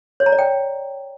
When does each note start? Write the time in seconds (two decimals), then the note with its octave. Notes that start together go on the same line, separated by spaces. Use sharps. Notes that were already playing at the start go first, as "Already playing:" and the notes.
0.20 C#5
0.26 A#5
0.32 D5
0.39 G5